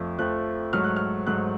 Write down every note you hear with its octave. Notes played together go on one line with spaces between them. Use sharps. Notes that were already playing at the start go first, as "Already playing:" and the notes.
Already playing: F2 F3 A3
F2 F3 A3 F#6
G#2 F#3 A3 F6
F#6
F6
G#2 F#3 A3 F#6